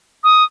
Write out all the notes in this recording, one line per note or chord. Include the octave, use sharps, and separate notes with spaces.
D#6